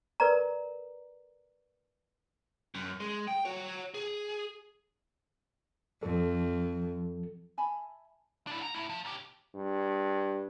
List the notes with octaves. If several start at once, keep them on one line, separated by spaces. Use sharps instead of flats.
A#4 B4 D5 A#5
F#2
G#3
G5
F#4 C#5
G#4
F2 F3 A4
E5 G#5 A5 B5
D4 E4
E2 A#5
A3 E4
F3
B1 G4
G2